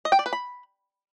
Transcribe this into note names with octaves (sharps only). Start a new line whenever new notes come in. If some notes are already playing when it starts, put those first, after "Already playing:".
D#5
G5
D5
B4
B5